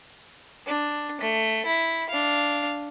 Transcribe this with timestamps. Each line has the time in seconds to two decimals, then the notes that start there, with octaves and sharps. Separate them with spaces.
0.66 D4
1.21 A3
1.66 E4
2.09 D4 F5